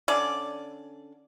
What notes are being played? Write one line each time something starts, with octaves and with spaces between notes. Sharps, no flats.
D3 C#4 D5